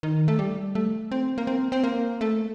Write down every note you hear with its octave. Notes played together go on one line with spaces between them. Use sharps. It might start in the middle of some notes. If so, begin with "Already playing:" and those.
D#3
A3
G3
A3
C4
A#3
C4
C4
A#3
A3